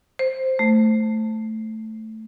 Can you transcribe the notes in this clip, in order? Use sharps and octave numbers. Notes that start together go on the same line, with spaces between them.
C5
A3